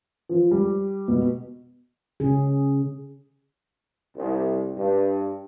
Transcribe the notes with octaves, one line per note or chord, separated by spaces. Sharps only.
F3
G3
B2
C#3 C#4 G#4
C2
G2